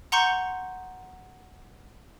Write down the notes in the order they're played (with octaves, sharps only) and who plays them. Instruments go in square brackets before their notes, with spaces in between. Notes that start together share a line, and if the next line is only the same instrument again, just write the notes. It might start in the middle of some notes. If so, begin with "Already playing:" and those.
[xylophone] F#5 A#5 C6 C#6 G6 C#7